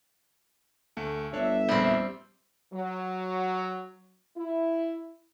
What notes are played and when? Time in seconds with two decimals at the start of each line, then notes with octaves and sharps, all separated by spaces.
0.97 D2 A3
1.33 G1 D4 C#5 E5
1.69 A#1 E2 G3 C4
2.73 F#3
4.37 E4